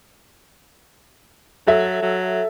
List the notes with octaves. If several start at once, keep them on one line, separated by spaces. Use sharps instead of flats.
F#3 A4 E5
F#3